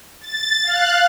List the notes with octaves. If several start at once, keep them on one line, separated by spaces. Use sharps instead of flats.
A6
F5 F#6